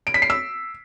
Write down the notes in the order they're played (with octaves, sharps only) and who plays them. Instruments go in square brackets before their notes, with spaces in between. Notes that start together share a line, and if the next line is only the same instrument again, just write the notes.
[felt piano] D7
B6
C7
E6